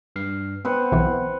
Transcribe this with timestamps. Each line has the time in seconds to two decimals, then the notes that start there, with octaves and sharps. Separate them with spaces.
0.16 G2 F6 C7
0.65 B3 C4 B4 F#5
0.92 B1 E3